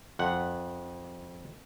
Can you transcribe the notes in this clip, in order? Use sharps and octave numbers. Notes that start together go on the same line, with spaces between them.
F2 F#5